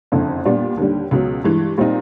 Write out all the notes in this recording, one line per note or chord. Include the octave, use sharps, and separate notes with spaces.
F#1 F2 D3
A#2 G3 B3 D4
D#2 D3 G3
C#2 B2 F#3
G2 E3 G#3
A#2 G3 C4 D#4